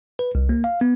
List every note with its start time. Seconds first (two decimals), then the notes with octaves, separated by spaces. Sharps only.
0.19 B4
0.35 C2
0.49 A#3
0.64 F5
0.81 B3